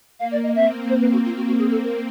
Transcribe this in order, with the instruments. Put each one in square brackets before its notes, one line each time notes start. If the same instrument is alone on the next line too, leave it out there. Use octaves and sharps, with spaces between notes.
[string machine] A#3 [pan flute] F5
[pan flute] D5
D#5
[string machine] C4 [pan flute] E5
[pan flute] C5
B4
F#4
F4
F#4
F#4
G#4
A4
A#4